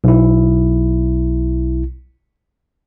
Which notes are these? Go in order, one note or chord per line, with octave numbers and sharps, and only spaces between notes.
B1 E4